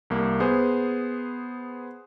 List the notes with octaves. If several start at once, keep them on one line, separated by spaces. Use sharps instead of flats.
C2 A#3
B3 G#4 C5